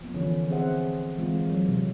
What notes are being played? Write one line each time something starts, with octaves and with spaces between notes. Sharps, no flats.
F3 B3
D3 E3 F3 C#4
C4 G#4 C5 E5 F#5
E3 G#3 C4 F4
F#3
C3